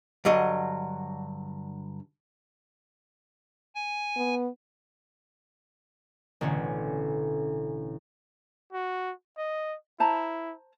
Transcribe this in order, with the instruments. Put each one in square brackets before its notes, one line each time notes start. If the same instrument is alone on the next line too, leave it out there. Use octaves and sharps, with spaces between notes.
[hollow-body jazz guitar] G2 D3 F#3 D#5
[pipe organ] G#5
[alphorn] B3
[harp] A1 B2 D3 C#4
[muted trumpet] F#4
D#5
[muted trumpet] E4 [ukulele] C5 A5 A#5